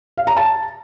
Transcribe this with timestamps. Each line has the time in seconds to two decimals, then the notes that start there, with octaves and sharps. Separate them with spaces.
0.17 F5
0.27 A#5
0.37 A5